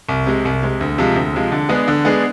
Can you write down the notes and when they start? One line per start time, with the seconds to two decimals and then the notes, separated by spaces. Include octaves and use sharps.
0.09 C2
0.26 C3 G#3
0.45 C2
0.63 C3 G#3
0.81 D2
0.98 C3 F3 G#3
1.16 D2
1.33 C3 F3 G#3
1.52 D3
1.69 G#3 B3 D4 G#4
1.88 D3
2.05 G#3 B3 D4 G#4